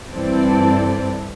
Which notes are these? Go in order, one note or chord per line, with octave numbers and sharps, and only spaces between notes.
G2 E3 C4 A4 D5